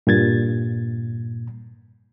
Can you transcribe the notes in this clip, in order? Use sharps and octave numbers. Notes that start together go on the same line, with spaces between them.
G2 A#2 G#6 A6